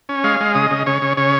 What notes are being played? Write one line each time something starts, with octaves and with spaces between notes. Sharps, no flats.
C#4
G#3 F5
G#3
C#3 D#5
C#3
C#3 C#5
C#3
C#3 C#5